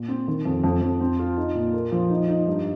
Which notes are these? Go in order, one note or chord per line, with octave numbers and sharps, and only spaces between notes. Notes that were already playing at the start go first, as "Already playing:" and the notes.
Already playing: A#2
C4
D#3
F2
F2
F2
C4
F4
D#4
A#2
A#3
F3
D#4
D#4
G2